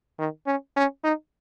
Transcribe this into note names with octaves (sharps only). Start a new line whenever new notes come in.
D#3
C#4
C#4
D#4